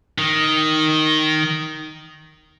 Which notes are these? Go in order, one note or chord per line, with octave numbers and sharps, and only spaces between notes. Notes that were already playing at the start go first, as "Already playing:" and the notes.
D#3